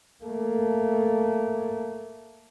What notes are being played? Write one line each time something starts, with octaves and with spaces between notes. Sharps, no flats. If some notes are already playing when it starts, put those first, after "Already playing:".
A3 A#3